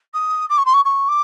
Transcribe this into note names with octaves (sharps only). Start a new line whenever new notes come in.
D#6
D6
C#6
C6
C#6
C#6
D6